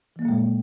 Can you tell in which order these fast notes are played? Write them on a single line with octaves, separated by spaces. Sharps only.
E3 A#3 F#3 A#2 G#3